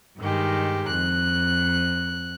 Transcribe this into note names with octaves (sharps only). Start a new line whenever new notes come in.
G2 D#3 G#3 G4
F2 F#6